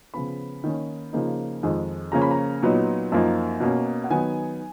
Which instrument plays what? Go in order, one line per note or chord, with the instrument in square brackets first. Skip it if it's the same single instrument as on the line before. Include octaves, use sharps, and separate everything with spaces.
[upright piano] C#3 F3 B3 B5
D#3 A#3 C#4
C#3 F3 A#3 D#4
F2 D#3 G#3
C#3 F3 A#3 C#4 A#5
B5
A#5
A#2 F#3 B3 D#4
F#2 F3 A#3 D#4
B2 A#3 C#4
F#5
D#3 F#3 B3 D#4 G#5